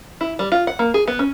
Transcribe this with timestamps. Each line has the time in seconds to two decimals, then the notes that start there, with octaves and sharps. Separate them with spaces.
0.21 E4
0.39 G3
0.52 F4
0.67 F#5
0.79 A#3
0.94 G#4
1.08 B3
1.19 C#4